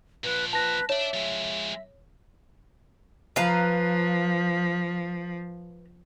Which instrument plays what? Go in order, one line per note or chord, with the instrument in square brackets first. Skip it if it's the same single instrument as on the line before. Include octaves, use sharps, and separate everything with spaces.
[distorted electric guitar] A#2 F3 [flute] B4
[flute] B4 [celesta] A5 A#6
[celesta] C#5 [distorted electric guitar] D5 A5 [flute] E5
[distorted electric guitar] F3 G#3
[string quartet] F3 [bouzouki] B4 F5 A#5